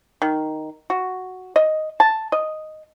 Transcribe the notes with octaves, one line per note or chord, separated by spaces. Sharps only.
D#3
F#4
D#5
A5
D#5